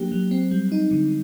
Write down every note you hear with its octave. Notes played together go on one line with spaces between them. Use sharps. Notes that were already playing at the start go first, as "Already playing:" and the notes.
Already playing: F#3 A#3 D4 G4
F#3
C4
G3
D#4
D3